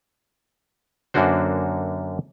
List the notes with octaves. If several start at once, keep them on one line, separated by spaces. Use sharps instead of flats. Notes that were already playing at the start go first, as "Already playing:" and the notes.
F#2 D3 A#3 D4 F#4 C5